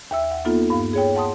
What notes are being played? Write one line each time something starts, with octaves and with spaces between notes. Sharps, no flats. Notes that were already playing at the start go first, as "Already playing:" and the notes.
D#2 E5 E6
F#5
A#3 B3 D#4 F4 A4
G2 F5
G#4 C#5 G5
F#5 A5 C6 D#6